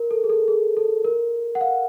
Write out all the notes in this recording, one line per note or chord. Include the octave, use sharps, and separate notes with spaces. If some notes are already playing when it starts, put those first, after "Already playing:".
Already playing: A#4
A4
G#4
A4
G#4
A4
A#4
F#5
F5